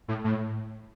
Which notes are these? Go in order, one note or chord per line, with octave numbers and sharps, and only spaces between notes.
A2
A2